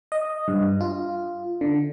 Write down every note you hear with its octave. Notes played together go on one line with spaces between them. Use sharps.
D#5
G2
F4
D3